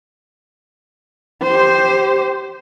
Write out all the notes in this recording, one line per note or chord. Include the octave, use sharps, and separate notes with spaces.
G4 C5